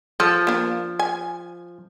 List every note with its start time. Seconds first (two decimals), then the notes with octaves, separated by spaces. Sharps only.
0.20 F3 A4
0.47 A#3 D4
0.99 G#5